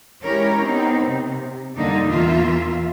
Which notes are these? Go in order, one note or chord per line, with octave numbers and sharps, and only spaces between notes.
G#3 C#4 E4 G4 A#4 C#5
B3 C4 D#4
C3
F2 D3 G3 A#3 D4 D#4
E2 A#2 E3 A#3 F4 E5